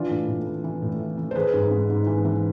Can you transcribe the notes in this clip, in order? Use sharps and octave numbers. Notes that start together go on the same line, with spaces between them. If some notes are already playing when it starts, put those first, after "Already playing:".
Already playing: E3 D4 F4
A2
A2
E3
E3
A2
E3
E3
C5
E3 G#4 B4
G#2
G#2
G#2
E3
E3